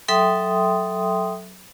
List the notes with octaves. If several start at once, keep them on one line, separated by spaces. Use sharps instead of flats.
F#3 A4 E5 G5 C6 D#6